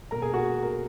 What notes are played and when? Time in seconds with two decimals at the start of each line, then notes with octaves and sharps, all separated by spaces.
0.11 B2 A#3 A#4 A#5
0.22 G#4 G#5
0.34 F#4 F#5
0.63 A#4